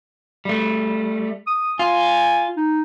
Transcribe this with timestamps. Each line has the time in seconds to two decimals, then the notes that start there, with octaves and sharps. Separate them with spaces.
0.45 G3 A3
1.47 D#6
1.79 F4 G#5
2.57 D#4